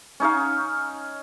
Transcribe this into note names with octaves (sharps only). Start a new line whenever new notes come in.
C#4 D#4 C#5 F5